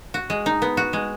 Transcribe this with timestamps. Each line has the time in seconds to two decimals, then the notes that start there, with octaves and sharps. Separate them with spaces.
0.14 F#4
0.30 G#3
0.46 D#4
0.62 B3
0.77 F#4
0.93 G#3